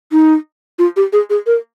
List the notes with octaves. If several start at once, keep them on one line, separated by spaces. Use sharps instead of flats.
D#4
F4
G4
G#4
G#4
A#4